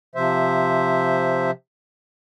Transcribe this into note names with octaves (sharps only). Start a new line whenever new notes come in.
C3 F3 C5 E5